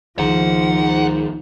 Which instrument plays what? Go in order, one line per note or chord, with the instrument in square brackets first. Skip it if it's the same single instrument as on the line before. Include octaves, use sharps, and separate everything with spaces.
[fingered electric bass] C#2 D#3 [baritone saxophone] G#2 [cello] F3 [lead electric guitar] F#5